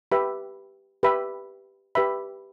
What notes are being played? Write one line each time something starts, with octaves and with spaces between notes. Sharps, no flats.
G4 B4 E5 B5
G4 B4 E5 B5
G4 B4 E5 B5